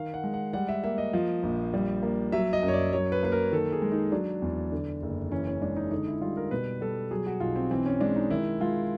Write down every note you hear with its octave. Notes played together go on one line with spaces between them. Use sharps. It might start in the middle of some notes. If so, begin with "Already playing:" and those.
Already playing: D#3 F5
F#5
G#3
F#5
G3 F#5
E5
A#3 E5
D#5
F3
A#1
G3
A#3
F#3 E5
D#5
F#2
C#5
D5
F#3 C#5
B4
A#3 B4
A#4
D#3 A4
G#4
G#3
D#4
F#3 D4
E2
D3
F#1
E3 C#4
C#4
G#3 D4
D#4
D3 D#4
E4
G3 F4
A#4
B2 B4
G3 A4
F#3 G#4
F#4
B1 F4
C4
E3 C4
C#4
G#3 D4
D#4
D#3 E4
G#3 F4